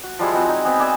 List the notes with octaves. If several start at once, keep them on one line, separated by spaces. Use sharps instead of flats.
F#4
F3 G3 G#3 E4
G#3 C4 F#4
D#4 G#5
B3 C4 D#6
D5 E5 G#5 E6